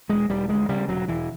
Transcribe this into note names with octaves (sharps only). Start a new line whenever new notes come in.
E1 G#3
E1 G3
D2 G#3
C#3 G3
E1 F#3
E1 E3